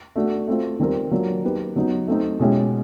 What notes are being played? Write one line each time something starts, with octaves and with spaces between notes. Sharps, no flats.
A3 D4 F#4
A3 C4 F4
D#3 G3 C4 F4 A#4
F#3 A#3 D4 F4
A#3 D#4 G4 B4
F#3 B3 D#4
A3 C4 D#4
B2 G#3 C#4 E4 G4